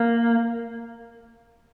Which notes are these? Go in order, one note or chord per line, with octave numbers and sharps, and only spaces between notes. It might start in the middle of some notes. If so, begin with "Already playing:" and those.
Already playing: A#3